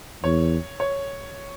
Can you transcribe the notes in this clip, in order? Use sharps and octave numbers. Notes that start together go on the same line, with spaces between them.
E2 C#5
C#5